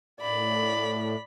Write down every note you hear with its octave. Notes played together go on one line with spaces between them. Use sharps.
A2 D5 B5